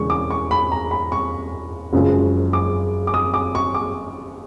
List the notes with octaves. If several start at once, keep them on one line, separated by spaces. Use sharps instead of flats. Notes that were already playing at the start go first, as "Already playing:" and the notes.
Already playing: E1 E2 C#3 C#6
D6
C#6
B5
A#5
B5
C#6
F#1 F#2 C#3 F3 G#3
D6
D6
D#6
D6
C#6
D6